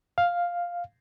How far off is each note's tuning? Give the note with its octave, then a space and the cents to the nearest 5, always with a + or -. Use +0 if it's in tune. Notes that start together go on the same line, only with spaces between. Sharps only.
F5 +5